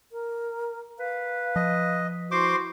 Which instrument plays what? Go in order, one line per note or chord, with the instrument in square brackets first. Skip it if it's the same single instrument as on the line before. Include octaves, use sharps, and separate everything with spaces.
[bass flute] A#4
[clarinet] B4 [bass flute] F5
[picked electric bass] F3 [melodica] D#5
[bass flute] E4 [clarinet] F#4 [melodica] C5 C6 D6